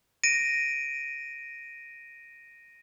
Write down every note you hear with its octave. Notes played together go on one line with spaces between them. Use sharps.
A#6 D7 D#7